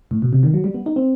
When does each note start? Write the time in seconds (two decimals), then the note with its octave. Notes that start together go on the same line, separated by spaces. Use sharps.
0.11 A2
0.22 B2
0.33 C3
0.43 D#3
0.54 F#3
0.64 G3
0.74 B3
0.86 D#4
0.96 C4